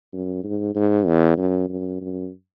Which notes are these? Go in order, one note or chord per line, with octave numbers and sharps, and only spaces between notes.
F#2
G#2
G#2
E2
F#2
F#2
F#2